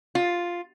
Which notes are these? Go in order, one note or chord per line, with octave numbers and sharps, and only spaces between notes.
F4